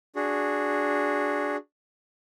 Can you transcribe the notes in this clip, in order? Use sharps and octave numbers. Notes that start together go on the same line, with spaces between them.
D4 F#4 G#4